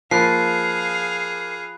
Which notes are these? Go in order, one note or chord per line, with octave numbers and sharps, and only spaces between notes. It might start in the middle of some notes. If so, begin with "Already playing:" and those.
F3 A#3 G#4 F5 B5 F#6 C7